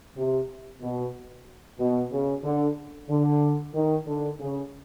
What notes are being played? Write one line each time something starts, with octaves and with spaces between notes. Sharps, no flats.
C3
B2
B2
C#3
D3
D3
D#3
D3
C#3